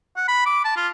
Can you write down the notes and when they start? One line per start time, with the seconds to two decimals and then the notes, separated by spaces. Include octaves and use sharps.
0.17 F#5
0.28 B5
0.46 D6
0.65 A5
0.77 F4